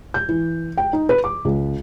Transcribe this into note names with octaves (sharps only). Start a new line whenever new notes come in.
G6
E3
G5
D#4
B4
D6
C#2